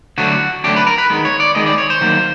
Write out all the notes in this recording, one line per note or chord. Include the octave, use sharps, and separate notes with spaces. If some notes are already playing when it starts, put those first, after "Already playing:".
D3 F#3 A3 D4 F#4
D3 F#3 A3 D4 G4
B4
A#4
B4
D#3 G#3 B3
C#5
D5
D#3 G#3 B3 D#5
D5
C#5
C5
D#3 F#3 A#3